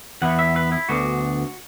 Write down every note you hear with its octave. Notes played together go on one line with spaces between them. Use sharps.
E2 E3 B3 E4 F#5
E5
B4
E4
D2 D3 B3 D4 F#4